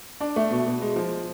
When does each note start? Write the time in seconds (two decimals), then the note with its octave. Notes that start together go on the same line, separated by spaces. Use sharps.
0.21 D4
0.36 A3
0.51 B2
0.66 B2
0.81 G#3
0.96 F3